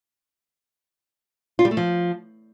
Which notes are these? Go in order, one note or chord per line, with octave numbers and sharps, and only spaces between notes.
F4
G3
A3
F3